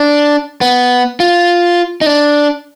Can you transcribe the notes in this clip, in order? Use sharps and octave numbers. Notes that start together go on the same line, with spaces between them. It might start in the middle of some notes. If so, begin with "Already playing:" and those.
Already playing: D4
B3
F4
D#4
D4